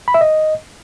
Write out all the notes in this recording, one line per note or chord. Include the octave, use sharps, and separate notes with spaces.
B5
E5
D#5